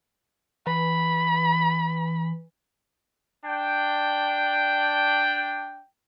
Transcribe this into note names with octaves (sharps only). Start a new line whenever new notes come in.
E3 B5
D4 G5